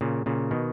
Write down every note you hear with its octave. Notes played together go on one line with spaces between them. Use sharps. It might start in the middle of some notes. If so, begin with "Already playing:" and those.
A#2 C#3
A#2 C#3
B2 D#3